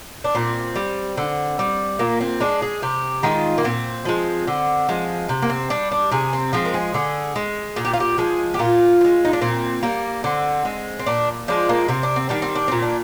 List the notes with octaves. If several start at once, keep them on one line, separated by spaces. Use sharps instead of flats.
D4
A#2 C4
G3
D3
G3
A#2 A#3
C4
G#3 D4
G#4
C3 G4
D#3 G#3 F4
A#3
A#2 C4
F3 G#3
D3
F3 G#3
C3
A#3
C4
G3 D4
D4
C3 G#4
C4
F3 G#3 C4
A#4
G#4
D3 G#4
G#3
A#2 G#4
G4
F4
G4
F3 G#3 G#4
G4
A#2 F4
F3
G#3
D#4
D4
A#2 C4
G3 A#3
D3 C4
G#3
C4
A#2 D4
F3 G#3 D4
A#3
C3 C4
D4
C4
D#3 G3 D4
C4
D4
A#2 C4
D4